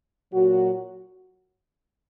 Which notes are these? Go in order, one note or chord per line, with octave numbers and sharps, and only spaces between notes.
A#2 F#3 F#4